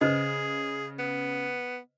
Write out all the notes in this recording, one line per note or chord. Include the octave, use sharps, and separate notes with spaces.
C#3 G#4 B4 C5 D#5
B3